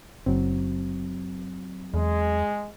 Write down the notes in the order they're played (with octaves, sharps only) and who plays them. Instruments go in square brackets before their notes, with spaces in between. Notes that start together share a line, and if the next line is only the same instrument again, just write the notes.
[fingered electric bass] F#1 [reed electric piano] F#3 C4
[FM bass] E2 [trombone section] G#3